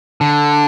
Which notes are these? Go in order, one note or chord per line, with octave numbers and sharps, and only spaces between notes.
D3